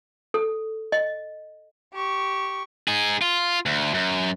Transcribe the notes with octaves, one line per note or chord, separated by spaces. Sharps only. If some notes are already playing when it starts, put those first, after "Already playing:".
A4
D#5
G4 C#6
D#4 G#4
F4
D2
F#2